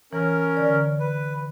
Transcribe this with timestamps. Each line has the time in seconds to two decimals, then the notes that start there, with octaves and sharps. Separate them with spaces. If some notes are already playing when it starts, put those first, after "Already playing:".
0.13 E3 C#4 A#4
0.57 D3 D5
1.00 B4